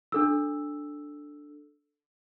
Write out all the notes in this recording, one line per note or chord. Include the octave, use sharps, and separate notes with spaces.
D4 A4 E6